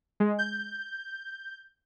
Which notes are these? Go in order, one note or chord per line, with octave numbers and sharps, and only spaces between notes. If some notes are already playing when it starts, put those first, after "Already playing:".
G#3
G6